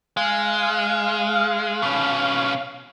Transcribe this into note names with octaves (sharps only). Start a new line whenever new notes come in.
G#3 F5
B2 C#4